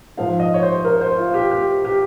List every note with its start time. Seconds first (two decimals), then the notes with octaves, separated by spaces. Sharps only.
0.17 G#2 F3 F5
0.40 D#5
0.54 C#5
0.63 C5
0.84 A#4
1.01 C5
1.18 F4
1.34 G4
1.51 G4
1.85 G4